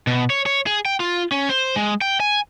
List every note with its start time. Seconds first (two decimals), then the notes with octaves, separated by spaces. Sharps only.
0.07 B2
0.30 C#5
0.46 C#5
0.67 G#4
0.85 G5
1.00 F4
1.31 C#4
1.49 C5
1.76 G#3
2.01 G5
2.20 G#5